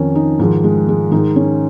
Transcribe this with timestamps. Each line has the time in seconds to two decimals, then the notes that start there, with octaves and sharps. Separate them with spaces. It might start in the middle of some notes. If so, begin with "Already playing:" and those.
Already playing: F2 D#3 C#4 D#4
0.15 D#4
0.39 G#2 D#3 F3
0.64 G#3
0.88 G#3
1.12 G#2 D#3 D#4
1.36 C#4